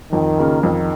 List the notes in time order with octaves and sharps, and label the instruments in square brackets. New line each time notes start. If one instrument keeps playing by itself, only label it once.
[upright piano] F2 [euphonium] D#3
[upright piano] C#3 A#3 C#4 F4
[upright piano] F2 [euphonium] D#3